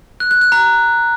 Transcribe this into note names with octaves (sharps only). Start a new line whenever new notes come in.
F#6
F#6
F#6
A#5